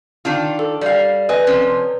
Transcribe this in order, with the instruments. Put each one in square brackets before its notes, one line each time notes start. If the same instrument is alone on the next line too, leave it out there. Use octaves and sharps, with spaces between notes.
[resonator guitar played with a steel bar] D#3 D4 F4
[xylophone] A4
[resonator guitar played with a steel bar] G3 F5 [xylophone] D5
[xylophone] B4 G#5 [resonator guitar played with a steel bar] D#5
[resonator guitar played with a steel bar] C3 F3 C#4